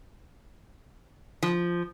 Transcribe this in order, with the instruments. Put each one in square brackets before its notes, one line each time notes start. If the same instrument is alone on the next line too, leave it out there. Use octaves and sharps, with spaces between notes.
[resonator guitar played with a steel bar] F3